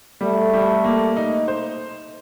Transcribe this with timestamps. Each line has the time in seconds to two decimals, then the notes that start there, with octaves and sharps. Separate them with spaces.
0.21 G3 A3
0.53 G3
0.84 A#3
1.17 D#4
1.48 C5